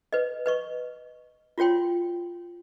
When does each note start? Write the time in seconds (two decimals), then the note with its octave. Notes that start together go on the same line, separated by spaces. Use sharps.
0.13 B4 D#5
0.46 B4 D#5 C#6
1.58 F4 F#4 C#5 G5 C6